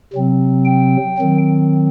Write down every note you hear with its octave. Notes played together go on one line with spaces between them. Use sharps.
C3 F#3 C4
G5
D#3 F#3 C4